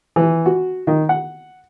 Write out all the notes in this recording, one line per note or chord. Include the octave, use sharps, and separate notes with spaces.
E3
F#4
D#3
F#5